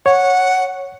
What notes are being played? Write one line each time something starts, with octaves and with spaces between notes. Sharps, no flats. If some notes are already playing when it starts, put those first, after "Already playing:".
C#5 F#5